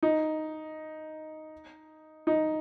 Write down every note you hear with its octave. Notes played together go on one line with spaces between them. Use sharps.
D#4
D#4